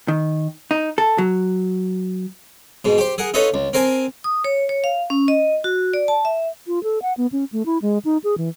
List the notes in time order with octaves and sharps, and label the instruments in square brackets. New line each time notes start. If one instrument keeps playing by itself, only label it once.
[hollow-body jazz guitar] D#3
D#4
A4
F#3
[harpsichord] G#2 B2
G4 C5
G#4 A#4 F#5
D#4 F4 A4 B4 C#5 D#5
C#2
C4 A#4 C5 G#5 A5
[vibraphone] D#6
C#5
C#5
F5
C#4
D#5
F#4
D5
A5
E5
[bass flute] F4
A4
F#5
B3
C#4
A3
E4
G#3
D#4
G#4
E3